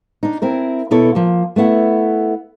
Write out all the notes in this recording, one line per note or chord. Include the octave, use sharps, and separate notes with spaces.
D4 D#4
C4 E4 A#4
B2 B3 E4 A4 C#5
F3 A#3
A3 B3 E4 F#5